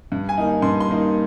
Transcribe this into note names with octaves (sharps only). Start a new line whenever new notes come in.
G2
G#5
D#3 A#3 D#4
G2 C6
C6
D#3 A#3 D#4